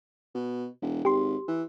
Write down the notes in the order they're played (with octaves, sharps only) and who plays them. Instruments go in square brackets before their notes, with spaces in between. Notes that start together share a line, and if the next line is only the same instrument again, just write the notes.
[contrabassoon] B2
E1
[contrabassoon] G#1 [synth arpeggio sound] G4 C6
[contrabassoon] E3